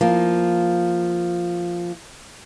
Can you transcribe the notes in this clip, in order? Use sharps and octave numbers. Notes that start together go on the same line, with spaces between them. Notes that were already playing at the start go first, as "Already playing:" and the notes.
F3 A#3